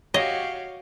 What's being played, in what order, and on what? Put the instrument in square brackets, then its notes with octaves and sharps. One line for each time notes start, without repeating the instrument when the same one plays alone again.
[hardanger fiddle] F#4 G4 [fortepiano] C#5 [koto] D#5 [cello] F5